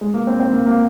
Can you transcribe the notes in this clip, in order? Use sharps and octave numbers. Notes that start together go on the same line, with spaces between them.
G#3
A#3
C4
C4
A#3
A#3